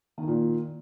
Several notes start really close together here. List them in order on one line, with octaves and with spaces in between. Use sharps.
D#3 A#3 A#2